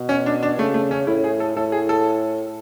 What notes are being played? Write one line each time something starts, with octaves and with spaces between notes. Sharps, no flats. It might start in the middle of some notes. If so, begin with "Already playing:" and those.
Already playing: B2
C#4
D4
D4
C#3 A3
A3
C#4
A2 E4
G#4
A4
A2 A4
G#4
A4